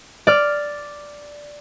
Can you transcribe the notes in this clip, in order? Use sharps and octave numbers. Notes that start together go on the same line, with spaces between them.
D5 F6